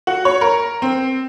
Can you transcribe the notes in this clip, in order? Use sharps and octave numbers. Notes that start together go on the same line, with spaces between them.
F#4
C#5
A#4
C4